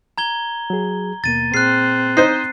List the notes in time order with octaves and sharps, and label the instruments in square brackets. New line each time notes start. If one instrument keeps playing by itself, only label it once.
[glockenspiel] A#5 G#6 G7
[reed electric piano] F#3 G#4
[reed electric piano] D#2 B2 A#3 [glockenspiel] A6 D#7
[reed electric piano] A#2 G#4 F6 [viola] C4 [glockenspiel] F#6 C7
[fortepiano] D#4 C5 [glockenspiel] C7